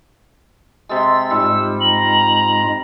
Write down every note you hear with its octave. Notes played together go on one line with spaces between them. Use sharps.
C3 G#3 E6 A6
G#2 G3 G#3 F4 E6
A#5 F#7